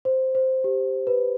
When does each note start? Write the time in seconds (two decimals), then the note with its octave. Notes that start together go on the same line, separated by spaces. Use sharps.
0.05 C5
0.35 C5
0.64 G4
1.07 B4